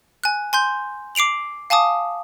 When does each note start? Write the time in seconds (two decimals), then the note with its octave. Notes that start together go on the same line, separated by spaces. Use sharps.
0.24 G#5 F#6
0.53 G#5 C6 G6
1.15 D6 C7 D7 F7 F#7
1.70 F5 G#5 A5 D6 D#6